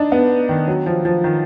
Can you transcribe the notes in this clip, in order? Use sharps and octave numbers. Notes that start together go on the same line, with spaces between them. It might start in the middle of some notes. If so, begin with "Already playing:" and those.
Already playing: D4 D#4
B3
D#3
F#3
F3
F3
D#3